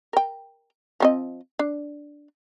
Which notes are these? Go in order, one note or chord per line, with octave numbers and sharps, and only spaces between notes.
A#4 G5
F3 C4 D#5
D4